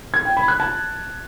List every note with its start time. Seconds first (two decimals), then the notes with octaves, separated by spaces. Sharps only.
0.14 G#6
0.25 G5
0.37 B5
0.48 F#6
0.60 A5